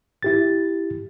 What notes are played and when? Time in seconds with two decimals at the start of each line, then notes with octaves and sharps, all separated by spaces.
0.23 E4 G4 A6